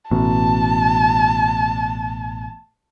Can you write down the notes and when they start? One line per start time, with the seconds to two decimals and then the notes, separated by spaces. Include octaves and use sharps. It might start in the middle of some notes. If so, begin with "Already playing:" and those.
0.11 A1 B2 A5